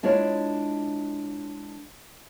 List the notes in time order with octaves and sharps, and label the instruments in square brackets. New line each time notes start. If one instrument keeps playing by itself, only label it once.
[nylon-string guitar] G#3 D4 E4 F4 C#5